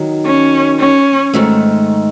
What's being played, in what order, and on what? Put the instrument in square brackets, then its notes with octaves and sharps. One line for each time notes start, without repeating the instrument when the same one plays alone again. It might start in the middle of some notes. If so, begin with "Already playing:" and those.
Already playing: [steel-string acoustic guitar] D#3 F#3
[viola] C#4
C#4
[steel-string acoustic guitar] G#2 D#3 A3